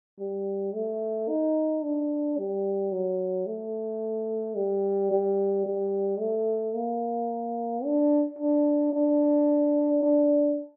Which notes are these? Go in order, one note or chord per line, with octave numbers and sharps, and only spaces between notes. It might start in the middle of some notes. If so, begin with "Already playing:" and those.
G3
A3
D#4
D4
G3
F#3
A3
G3
G3
G3
A3
A#3
D4
D4
D4
D4